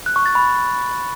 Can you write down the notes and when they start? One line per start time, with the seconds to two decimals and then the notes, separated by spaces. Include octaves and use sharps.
0.06 F#6
0.16 C#6
0.26 A6
0.35 B5